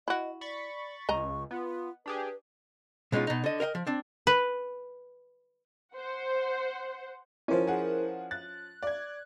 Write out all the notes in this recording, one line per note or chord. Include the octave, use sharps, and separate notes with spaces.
E4 F#4 D#5
D5 B5 C#6 A6
C#2 D#5 A#5 C#6
B3 F4
D4 G4 G#4 B4
B2 G#3 C#4 D#4 F4
B2 D#4
D3 D#5
A#4 D#5 F5 G5
F3
C4 D4
B4
C5 F#5
F3 C#4 E4 A#4 C5
G#4 F#5
F#6 A6
D5 G#6